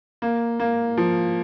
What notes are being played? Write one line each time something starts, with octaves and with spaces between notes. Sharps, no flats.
A#3
A#3
F3